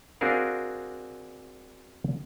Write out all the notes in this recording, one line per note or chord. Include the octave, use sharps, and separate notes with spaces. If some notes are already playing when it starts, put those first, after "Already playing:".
C4 D4 F#4 G#4 A#4 F5